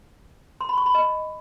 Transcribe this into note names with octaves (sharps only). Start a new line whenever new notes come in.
C6
B5
C#6
B5
D#5